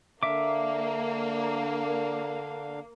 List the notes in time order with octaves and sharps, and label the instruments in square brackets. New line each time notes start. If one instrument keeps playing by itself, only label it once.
[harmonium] D3 D4 F5 [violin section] A#3 [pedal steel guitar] E5 D6